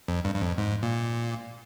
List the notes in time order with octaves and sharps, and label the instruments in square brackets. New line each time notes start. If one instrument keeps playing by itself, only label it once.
[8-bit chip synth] F2
G2
G2
F2
G#2
A#2